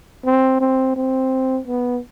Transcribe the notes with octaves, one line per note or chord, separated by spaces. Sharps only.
C4
C4
C4
B3